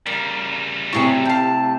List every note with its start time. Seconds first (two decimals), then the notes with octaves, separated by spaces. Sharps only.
0.06 C#3 G3 A#3
0.93 A2 C3 F#4 G#4 C#5
1.25 G4 F5 A5